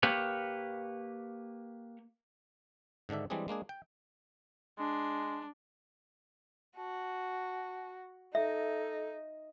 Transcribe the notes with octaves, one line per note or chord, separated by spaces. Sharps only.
A#3 G4 B4 C#5
G#2 D3 D#3 D4 E5
E3 G3 G#3 C4 D4 G#4
G#3 A#3 D4 G#4
G5
G#3 D4
F#4 A5
D#4 A4 E5